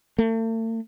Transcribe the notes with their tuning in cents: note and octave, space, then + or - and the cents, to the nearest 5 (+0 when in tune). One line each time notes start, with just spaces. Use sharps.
A3 +40